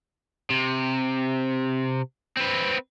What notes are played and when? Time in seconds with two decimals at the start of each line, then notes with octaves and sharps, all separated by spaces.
0.50 C3
2.37 C4 B4